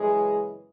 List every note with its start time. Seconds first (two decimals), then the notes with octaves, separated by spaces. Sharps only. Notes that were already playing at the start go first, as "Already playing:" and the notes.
Already playing: F#2 C#3 E3 G#3 G#4